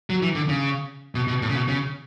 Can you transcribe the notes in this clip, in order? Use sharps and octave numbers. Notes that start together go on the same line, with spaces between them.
F#3
E3
D3
C#3
B2
B2
A2
C#3
B2
C#3